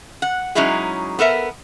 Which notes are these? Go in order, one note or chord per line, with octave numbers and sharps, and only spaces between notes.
F#5
F#3 G#3 C#4 D#4 E4 G#4
B3 A4 A#4 E5